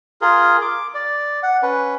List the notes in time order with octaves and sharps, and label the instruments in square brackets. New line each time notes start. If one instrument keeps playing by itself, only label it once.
[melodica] F4 G#4 A#4
D6
D5
F#5
C#4 B4